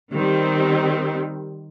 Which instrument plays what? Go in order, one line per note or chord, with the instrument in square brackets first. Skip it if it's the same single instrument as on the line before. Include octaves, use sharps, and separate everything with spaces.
[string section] D#3 G3 C4